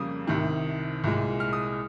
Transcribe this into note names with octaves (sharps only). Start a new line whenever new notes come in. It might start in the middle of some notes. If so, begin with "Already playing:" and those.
Already playing: F2 C#3 G3 A#3 D#6
C2 C3 D#3
C2 A#2 G#3
F6
D#6